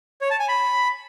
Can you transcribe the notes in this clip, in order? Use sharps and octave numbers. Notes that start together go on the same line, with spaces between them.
C#5
A5
G#5
B5